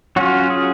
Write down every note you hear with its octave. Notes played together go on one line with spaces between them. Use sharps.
F#3 C#4 F4 F#4
G#4